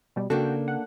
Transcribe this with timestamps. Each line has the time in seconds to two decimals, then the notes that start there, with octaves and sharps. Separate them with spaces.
0.16 B2 G3
0.30 C#3 A#3 D4 F#4 A4 G5
0.68 F#5